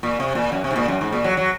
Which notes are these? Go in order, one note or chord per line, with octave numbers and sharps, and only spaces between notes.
A#2
C3
A#2
F#2
C3
G#2
A#2
F#2
G#2
A#2
F#3
F#3